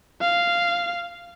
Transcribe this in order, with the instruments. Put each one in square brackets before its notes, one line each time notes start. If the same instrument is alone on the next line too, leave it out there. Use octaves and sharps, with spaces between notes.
[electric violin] F5